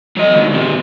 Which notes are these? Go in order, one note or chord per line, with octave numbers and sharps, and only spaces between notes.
F#3 D#5
C#2 D#3
A#2 C4